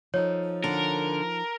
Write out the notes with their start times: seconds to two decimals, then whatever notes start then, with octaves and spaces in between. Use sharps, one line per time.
0.14 F3 D#4 A4 C#5
0.64 D3 A#4